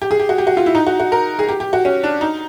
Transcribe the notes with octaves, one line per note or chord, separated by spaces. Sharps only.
G4
G#4
G4
F#4
G4
F#4
F4
E4
D#4
F#4
F#4
A#4
G#4
G4
G4
F#4
C#4
D4
D#4